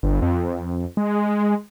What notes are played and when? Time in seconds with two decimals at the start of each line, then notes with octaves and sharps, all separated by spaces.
0.03 G1
0.22 F2
0.97 G#3